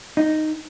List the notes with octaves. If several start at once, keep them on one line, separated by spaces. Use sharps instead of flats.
D#4